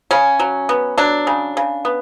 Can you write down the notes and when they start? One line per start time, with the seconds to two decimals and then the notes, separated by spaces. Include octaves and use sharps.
0.11 C#3 C#4
0.40 F#3
0.69 B3
0.98 F#3 D4
1.27 C#3
1.57 C#3
1.85 B3